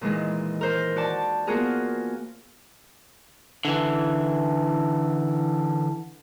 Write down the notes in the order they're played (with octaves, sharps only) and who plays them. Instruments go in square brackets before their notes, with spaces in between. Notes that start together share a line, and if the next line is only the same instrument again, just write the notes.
[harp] A#2 D#3 E3 G#3
A#4 C5
F#4 D5 A5
A#3 B3 F4 F#4 G#4 A#4
[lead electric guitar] D3 E3